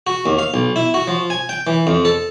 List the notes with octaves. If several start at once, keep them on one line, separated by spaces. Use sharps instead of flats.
F#4
D#2
F5
B1
E4
F#4
F3
G#5
G5
E3
F2
A4